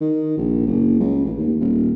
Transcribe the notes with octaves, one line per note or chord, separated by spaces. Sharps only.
D#3
A#1
F#1
C#2
A1
D#2
D#1